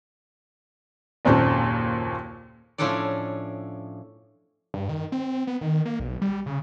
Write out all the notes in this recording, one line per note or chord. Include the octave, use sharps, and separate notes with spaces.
F#1 D#2 A#2 C4 C#4 A4
A2 F3 C#4 D4 A4 D5
G2
D#3
C4
B3
D#3
A#3
B1
G3
C#3